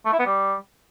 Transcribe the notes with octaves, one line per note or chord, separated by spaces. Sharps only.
A3
E4
B3
G3